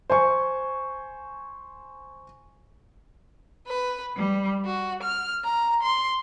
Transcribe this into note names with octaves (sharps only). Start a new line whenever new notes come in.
C5 G#5 C#6
B4
G3
F#4
F6
A#5
C6